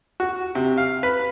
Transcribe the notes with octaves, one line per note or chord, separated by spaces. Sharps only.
F#4
C3
F5
B4